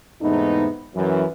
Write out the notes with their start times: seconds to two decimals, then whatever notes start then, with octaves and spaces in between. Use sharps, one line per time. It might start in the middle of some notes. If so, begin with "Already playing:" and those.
0.22 E2 G#2 C3 A3 B3 D#4
0.94 F#2 E3